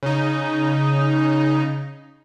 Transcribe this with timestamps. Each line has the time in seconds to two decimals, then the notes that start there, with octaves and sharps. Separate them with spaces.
0.03 C#3 D#4